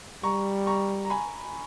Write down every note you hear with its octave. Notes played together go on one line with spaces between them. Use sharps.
G3 A#5 C#6
A#5 C#6
A#5
G#5 B5